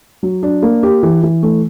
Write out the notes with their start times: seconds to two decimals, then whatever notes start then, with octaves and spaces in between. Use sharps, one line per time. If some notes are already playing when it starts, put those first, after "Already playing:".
0.23 F#3
0.43 D4
0.62 A#3
0.83 G4
1.03 E3
1.23 E3
1.43 A3